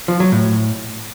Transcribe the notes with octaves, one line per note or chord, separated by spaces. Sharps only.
F3
F#3
A2